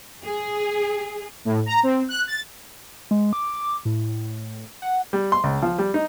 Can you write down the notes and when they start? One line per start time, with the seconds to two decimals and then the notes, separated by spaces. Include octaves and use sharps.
0.25 G#4
1.45 A2
1.66 A#5
1.83 C4
2.09 F#6
2.27 A6
3.11 G#3
3.33 D6
3.85 A2
4.82 F#5
5.13 G3
5.32 C6
5.44 C#2
5.62 F3
5.78 G3
5.94 D#4